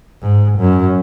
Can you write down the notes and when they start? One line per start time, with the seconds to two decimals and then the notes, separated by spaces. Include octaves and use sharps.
0.22 G#2
0.59 F#2